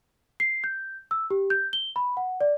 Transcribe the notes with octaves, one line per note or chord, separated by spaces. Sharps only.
C7
G6
E6
G4
G6
G7
B5
F#5
D5